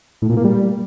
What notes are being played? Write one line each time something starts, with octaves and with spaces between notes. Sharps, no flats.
A2
A#2
A#3
G3